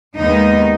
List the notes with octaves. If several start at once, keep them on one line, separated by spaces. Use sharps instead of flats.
D#2 D#3 G#3 B3 D#4